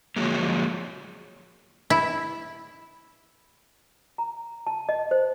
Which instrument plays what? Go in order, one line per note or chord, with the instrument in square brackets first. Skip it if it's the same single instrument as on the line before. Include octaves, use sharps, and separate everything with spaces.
[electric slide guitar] D3 F3 F#3 G#3 A#3
[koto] E4
[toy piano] A#5
A5
D#5
C5